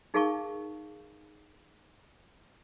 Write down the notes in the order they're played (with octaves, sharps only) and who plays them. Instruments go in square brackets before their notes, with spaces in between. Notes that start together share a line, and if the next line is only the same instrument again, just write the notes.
[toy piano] D#4 G#4 A#4 F5 A5 C#6